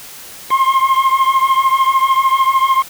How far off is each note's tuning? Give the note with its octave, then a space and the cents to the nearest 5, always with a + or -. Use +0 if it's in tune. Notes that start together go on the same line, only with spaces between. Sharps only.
C6 +30